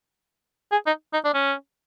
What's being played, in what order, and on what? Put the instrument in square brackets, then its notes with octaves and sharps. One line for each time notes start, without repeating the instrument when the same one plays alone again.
[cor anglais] G#4
D#4
D#4
D4
C#4